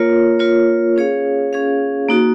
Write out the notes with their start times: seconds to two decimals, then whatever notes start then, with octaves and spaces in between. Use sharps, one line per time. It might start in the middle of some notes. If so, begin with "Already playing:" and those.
Already playing: A#3 F4 A#4 C#5
0.39 A#3 F4 A#4 C#5
0.96 C#4 G#4 C#5 F5
1.53 C#4 G#4 C#5 F5
2.09 A#3 D#4 F#4